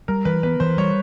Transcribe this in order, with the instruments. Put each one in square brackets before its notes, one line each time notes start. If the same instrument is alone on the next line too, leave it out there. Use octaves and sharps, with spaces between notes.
[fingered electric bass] G3 [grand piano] A#4
[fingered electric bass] E3 [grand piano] B4
[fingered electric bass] B3 [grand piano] B4
[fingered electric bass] E3 [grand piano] C5
[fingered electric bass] G3 [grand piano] C#5